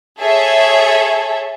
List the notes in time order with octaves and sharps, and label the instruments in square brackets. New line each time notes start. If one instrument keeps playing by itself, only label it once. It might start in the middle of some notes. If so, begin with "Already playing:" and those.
[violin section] G#4 A4 C#5 E5